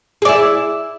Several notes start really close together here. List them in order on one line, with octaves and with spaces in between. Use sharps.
G#4 D5 E4